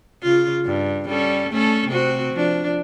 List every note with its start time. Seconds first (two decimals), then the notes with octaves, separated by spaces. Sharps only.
0.23 C#3 F4
0.65 G2
1.09 G3 C#4 A4
1.51 A3 C#4 A4
1.89 C3 C4 F#4
2.33 F3 D4